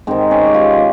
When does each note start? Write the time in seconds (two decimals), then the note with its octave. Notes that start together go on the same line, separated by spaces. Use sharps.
0.07 G#2 D#3 C4
0.31 C#4
0.46 G4
0.54 F4